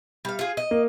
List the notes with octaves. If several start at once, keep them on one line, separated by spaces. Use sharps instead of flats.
G3 F5
F4 G#4
D#5
A#3